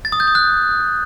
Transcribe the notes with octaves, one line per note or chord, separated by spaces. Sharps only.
A6
D#6
G6
D#6
F#6